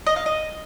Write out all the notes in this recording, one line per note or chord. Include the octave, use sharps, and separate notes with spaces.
D#5
F5
D#5